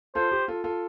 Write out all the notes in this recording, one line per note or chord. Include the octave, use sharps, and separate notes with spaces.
F4 A4 C5
G4
F4 A4
F4 A4